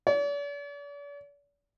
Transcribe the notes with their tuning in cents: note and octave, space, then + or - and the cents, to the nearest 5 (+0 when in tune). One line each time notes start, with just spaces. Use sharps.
D5 -45